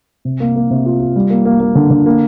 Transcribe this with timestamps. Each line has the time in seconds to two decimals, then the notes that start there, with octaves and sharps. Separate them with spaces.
0.25 C3
0.40 A#3
0.56 A#3
0.70 C3
0.86 F4
1.00 F4
1.16 G3
1.30 A#3
1.45 A#3
1.60 A#3
1.75 D3
1.91 D3
2.06 A#3